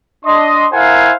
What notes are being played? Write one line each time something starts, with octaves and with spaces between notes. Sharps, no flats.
D4 D#5 C6
E4 A#4 C5 F5 F#5 G#5